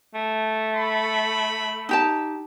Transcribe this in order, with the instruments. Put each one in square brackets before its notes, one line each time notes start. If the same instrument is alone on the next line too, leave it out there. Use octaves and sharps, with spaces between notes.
[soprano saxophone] A3
[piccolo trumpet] B5
[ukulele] D#4 G4 A5